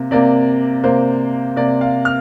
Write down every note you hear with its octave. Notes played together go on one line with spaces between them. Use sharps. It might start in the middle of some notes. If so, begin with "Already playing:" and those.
Already playing: C3 A#3
C3 A#3 D5
C3 A#3 C5
C3 A#3 D5
F5
F6